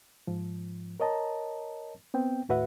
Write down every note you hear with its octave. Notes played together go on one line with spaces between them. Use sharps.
G#2 F3
A#4 C#5 D#5 A5 A#5
B3 C4 G5
D#2 A2 F#4 B4 E5 F#5